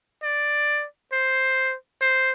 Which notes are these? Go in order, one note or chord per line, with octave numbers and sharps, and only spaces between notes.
D5
C5
C5